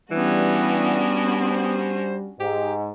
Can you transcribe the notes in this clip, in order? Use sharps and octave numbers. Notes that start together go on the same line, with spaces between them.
E3 G3 B3 C#4 D4 F#4
C5
G#2 G4